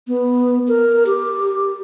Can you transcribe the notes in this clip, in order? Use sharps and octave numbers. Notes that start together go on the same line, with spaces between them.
B3
A#4
G4